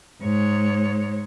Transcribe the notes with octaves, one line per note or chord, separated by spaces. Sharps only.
G#2 C#5